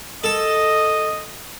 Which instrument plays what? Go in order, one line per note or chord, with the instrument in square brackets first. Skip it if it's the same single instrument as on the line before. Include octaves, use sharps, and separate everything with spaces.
[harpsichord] A4 [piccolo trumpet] D#5